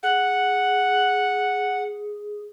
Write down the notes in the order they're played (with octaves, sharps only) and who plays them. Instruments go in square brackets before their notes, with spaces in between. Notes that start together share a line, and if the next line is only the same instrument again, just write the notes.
[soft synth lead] G#4 [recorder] F#5